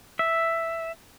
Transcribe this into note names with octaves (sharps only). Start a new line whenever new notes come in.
E5